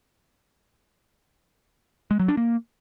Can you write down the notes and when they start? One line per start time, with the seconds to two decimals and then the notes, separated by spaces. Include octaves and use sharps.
2.11 G#3
2.20 F#3
2.28 D4
2.37 A#3